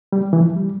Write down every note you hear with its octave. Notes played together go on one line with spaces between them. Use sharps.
G3
E3
F3
G3